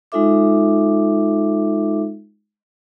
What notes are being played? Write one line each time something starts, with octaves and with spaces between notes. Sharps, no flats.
G#3 D#4 F4 A4 E5 D6